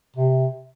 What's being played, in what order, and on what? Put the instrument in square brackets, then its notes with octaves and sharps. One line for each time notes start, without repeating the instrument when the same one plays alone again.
[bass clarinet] C3